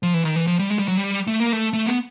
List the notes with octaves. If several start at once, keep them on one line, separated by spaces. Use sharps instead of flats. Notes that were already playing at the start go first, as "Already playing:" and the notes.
F3
E3
D#3
E3
F3
G3
G#3
G3
F#3
G3
A3
A#3
A3
A3
B3